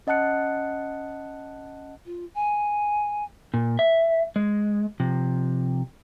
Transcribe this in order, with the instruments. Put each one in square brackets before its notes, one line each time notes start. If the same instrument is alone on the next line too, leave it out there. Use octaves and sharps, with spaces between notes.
[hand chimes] C#4 D#5 F#5 A5 F#6 C#7
[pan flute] F4
G#5
[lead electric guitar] A#2
E5
G#3
C3 F3